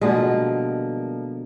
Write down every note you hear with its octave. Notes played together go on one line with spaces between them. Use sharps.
B2 D3 F3 G3 G#3 A#3